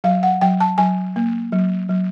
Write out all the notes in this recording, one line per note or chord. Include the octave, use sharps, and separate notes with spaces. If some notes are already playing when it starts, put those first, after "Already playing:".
F#3 F5
F#5
F#3 G5
A5
F#3 G#5
A#3
F#3
F#3